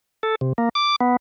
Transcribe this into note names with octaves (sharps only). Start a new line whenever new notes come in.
A4
C3
A#3
D6
B3